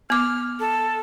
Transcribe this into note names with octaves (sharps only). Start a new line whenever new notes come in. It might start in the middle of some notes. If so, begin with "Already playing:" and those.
B3 D6 F6
A4